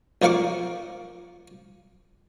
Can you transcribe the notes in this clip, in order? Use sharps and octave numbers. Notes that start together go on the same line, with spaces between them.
B1 F3 A#3 F5 C#6 D6